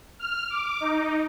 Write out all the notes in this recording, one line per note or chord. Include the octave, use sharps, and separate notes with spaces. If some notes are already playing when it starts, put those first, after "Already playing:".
F6
D6
D#4